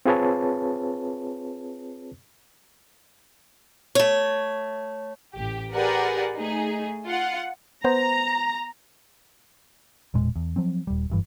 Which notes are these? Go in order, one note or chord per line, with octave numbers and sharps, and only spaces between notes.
C4 F4 G#4 B4 C#5 A5
A3 C#5
A1 G4
G4 G#4 A#4 B4 D5 F#5
A3 D#4 G#4
F4 F#5
B3 C5 A#5
E1 A#2 G#3
E2
F3 F#3 C4
D#1 G3
F#1 G2 E3